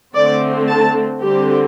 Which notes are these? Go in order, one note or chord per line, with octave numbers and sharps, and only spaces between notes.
D3 A3 C4 D5
A5
D3 G3 C4 G4